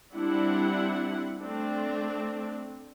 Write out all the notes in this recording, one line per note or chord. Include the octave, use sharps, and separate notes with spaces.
G3 C4 D4 E4 F#5
A3 C4 D4